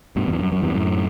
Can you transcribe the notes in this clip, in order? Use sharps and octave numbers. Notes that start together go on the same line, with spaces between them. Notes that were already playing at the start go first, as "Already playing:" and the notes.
G2 B2
E2 G2
F#2
F#2
E2 G2
F#2 A2